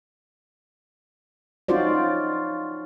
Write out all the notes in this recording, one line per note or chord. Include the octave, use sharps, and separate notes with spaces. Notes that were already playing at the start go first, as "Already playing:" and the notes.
C#4 D#4 F4 F#4 C5 D5